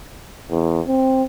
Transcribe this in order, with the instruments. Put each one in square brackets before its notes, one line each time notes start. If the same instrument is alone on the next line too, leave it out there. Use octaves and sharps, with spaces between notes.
[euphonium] E2
C4